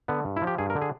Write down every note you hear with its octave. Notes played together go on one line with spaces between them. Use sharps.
D3 B3
G2
E4
F3
G4
G2 G#4
A#4
D3
G#4